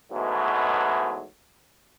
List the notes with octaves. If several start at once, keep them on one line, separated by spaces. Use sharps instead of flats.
G#2 B2 E3 F#3 A3